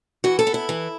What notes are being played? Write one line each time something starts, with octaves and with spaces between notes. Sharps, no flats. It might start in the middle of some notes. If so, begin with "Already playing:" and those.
E3 F#4
A4
B3
E4
E3